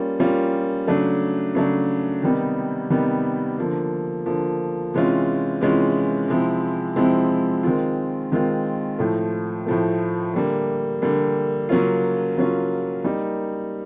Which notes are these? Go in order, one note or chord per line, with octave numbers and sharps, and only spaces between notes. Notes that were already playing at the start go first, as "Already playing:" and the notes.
Already playing: G3 A#3 C#4 F4
G3 A#3 C#4 F4
C#3 F#3 A3 D4
C#3 F#3 A3 D4
C3 D#3 G3 B3 D#4
C3 D#3 G3 B3 D#4
D3 F3 A#3
D3 F3 A#3
C3 E3 G#3 C#4 F4
C3 E3 G#3 C#4 F4
C3 F3 G#3 C4 E4
C3 F3 G#3 C4 E4
D#3 G#3 C4 F4
D#3 G#3 C4 F4
A2 F3 A3
A2 F3 A3
D3 G3 A#3
D3 G3 A#3
C#3 F#3 A#3 C#4 F4
C#3 F#3 A#3 C#4 F4
G3 A#3 D#4